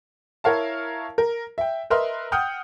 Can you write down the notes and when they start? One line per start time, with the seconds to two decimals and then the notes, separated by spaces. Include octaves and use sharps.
0.44 E4 A#4 C#5 F5 A5
1.18 A#4
1.58 E5 G5
1.90 A#4 B4 D#5 E5 C6 F6
2.32 F#5 G5 D#6 F6 G6